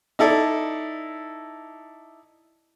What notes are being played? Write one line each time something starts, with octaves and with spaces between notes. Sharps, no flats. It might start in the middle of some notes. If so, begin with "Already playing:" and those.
D#4 E4 A4 D5